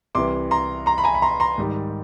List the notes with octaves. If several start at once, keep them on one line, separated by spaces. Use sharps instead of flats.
C2 C3 E3 C6 D6
A#5 C6
A#5 C6
B5
G#5 A#5
B5
A#5 C6
A#5 C6
G#2 D#3 G3